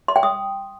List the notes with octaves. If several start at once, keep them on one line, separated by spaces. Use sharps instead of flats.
C6
G5
D#6